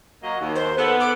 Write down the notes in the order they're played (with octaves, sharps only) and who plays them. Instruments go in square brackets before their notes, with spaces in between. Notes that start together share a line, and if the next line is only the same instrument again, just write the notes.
[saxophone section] F#3 A#3 D#5
D#2
[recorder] C5
[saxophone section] B3 [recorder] A4
[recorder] D6